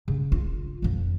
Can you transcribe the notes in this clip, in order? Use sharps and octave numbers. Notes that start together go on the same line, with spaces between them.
C#3
F4
F2 F3